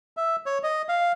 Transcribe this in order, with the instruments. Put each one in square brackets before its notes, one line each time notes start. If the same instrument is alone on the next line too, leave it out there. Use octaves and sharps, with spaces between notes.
[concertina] E5
C#5
D#5
F5